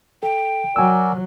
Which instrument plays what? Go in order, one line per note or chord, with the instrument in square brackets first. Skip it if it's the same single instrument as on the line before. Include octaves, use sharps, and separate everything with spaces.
[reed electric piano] A4 [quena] G5
[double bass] F#3 [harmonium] F#4 A#4 D5 [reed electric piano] G#5 E6